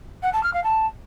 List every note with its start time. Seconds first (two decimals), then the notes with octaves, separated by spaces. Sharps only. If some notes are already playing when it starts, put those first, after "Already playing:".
0.23 F#5
0.33 A5
0.43 F6
0.54 F5
0.64 A5